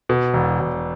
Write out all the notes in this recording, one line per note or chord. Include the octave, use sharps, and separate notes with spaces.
B2
E1
E1